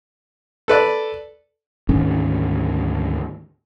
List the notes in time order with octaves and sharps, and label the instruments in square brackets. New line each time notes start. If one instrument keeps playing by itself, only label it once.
[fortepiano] A4 B4 D5
[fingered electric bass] D2 G#2 D#3 C#4